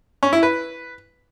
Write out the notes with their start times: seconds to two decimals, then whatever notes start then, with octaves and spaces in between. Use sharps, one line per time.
0.23 C#4
0.33 E4
0.43 B4